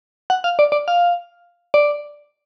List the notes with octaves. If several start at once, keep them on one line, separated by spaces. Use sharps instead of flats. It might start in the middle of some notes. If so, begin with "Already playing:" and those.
F#5
F5
D5
D5
F5
D5